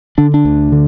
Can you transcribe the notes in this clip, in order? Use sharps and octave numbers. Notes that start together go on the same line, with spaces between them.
D3 D4
D4
D2
D3